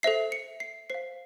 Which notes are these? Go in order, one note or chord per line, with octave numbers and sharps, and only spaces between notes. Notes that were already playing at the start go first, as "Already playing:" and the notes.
A4 C5 E5 C7
C#7
C7
C5 F5 C7